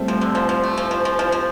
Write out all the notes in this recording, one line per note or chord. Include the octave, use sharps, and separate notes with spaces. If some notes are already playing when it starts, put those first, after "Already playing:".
Already playing: G3 A3 C4
F3
D3
F3
F3
A3
F3
F3
F3
F3
F3